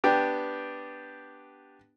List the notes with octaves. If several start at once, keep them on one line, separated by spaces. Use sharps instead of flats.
B3 D4 G4 G5